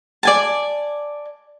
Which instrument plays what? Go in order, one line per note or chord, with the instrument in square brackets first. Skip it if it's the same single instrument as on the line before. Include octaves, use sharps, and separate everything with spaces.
[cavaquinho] D5 G#5 A5